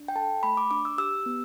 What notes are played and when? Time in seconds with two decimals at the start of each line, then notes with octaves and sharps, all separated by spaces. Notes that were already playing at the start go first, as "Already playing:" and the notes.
Already playing: D4
0.08 G5
0.16 A4 A5
0.43 A3 B5
0.57 D6
0.71 D4 D6
0.85 E6
0.98 G4 E6
1.26 B3